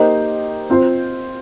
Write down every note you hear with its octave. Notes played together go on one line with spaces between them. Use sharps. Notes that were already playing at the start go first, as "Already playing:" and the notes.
Already playing: A#3 D#4 G4 C5 D#5
C4 F4 C5